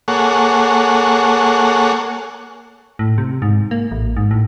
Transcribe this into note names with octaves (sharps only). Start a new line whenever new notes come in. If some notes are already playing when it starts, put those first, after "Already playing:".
A#3 G#4 A4 C#5 F#5
A2
C3
G#2
A#3
A1
G#2
A2